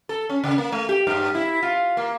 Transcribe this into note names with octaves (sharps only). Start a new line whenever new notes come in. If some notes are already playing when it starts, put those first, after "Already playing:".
A4
C#4
C#3
A#3
A3
G4
G2
E4
F4
A#3